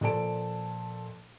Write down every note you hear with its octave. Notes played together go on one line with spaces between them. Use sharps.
A#2 F3 A4 D5 A5 D7